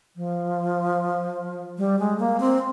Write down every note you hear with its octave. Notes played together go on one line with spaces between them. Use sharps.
F3
G3
G#3
A#3
C4